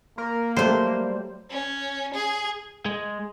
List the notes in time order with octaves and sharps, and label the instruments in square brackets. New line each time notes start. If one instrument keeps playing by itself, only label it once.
[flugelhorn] A#3 [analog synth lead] A#4
[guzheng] F#3 A3 [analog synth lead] G3 [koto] C5
[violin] C#4
G#4
[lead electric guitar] G#3